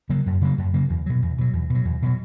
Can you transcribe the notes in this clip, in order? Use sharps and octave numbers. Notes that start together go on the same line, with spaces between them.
C#3 F#3 A#3
F#2
C#3 F#3 A#3
F#2
C#3 F#3 A#3
E2
B2 F#3
E2
B2 F#3
E2
B2
F#3
E2
B2 F#3